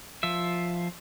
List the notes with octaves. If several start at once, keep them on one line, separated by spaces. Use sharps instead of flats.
F3 F4 E5